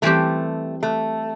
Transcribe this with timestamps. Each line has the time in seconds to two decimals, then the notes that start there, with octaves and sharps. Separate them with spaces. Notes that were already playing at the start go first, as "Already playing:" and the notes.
0.02 E3 G3 A3 C4 G4
0.83 A3